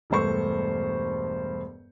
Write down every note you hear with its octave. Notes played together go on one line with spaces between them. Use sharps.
E1 G2 A3 C5 C#6